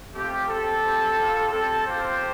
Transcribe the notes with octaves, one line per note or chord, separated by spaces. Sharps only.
A3 C4 F4 G4
C4 G4 A4
C4 G4
G3 F4
C4 G4 A4
C4 F4 G4 C5